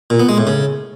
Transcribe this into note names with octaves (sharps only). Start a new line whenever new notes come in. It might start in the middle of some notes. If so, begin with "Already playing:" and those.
A#2
B3
G#3
A2
C#3